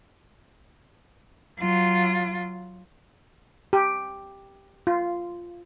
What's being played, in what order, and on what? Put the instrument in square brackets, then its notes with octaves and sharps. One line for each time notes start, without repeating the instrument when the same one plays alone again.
[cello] F#3 F4
[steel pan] G4
F4